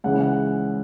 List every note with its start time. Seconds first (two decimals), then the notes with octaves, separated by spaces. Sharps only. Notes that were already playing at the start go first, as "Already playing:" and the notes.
0.04 C#2 C#3 E3 F#5
0.21 F#5